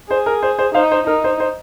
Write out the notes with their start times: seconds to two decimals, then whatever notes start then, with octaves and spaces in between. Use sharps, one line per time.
0.10 G#4 C5
0.26 A#4
0.43 C5
0.59 C5
0.74 D#4 C5 F5
0.91 C5
1.07 D#4 A#4
1.24 C5
1.40 C5